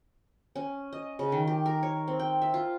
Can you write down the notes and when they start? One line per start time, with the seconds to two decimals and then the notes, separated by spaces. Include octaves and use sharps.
0.56 C#4
0.93 D#5
1.19 C#3
1.32 D#3
1.47 G4
1.66 A#4
1.83 C#5
2.08 C4
2.20 G5
2.42 E5
2.54 F4